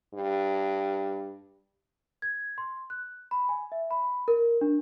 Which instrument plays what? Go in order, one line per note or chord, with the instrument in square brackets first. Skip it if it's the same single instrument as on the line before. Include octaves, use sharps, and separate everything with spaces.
[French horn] G2
[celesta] G#6
C6
F#6
B5
G#5
E5
B5
A#4
D4